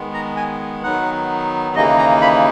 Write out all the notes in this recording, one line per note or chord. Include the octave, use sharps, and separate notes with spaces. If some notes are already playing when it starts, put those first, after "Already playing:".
Already playing: D#3 G#3 B3
A#5
G#5
D#3 F#3 B3 D#4 F#5
D#2 C#3 E3 A#3 D#4 D#5
A#5
B5